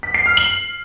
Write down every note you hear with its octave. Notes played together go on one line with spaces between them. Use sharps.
B6
C7
F6
F#7